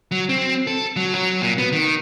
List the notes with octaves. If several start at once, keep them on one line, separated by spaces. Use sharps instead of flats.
F#3
C4
A4
F#3
F#3
A#2
B3
D#3